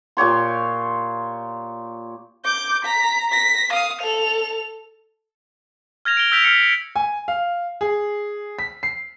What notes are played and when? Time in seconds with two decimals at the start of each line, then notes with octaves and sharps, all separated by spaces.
0.17 A#2 G4 C#5 C6
2.45 D6 G6
2.85 A#5 B6
3.30 A#6 B6
3.73 F5 D#6
4.01 A4 F7
6.05 F6 G#6 A#6 F7
6.17 D7 G7
6.32 E6 G6 B6 D7 F7
6.44 F6 B6 C#7
6.60 D7
6.96 G#5
7.28 F5
7.81 G#4
8.59 B6
8.83 C7